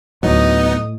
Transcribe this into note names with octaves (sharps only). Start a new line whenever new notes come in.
D2 A2 F#3 B3 D#4 D#5 D#6